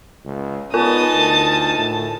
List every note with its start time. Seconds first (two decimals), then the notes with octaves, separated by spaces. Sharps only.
0.25 C#2
0.74 B3 D#4 F4 A#4 G#5 A5 D#6
1.14 D2
1.78 A2